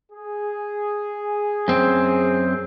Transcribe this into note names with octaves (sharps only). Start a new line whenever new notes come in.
G#4
F#2 C4